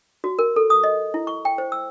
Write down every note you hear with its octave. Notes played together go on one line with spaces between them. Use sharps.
F#4
A#4
A4
D#6
D#5
E4
C#6
G5
C5
E6